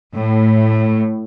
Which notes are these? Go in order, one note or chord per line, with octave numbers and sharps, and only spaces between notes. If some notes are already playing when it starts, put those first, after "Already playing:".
A2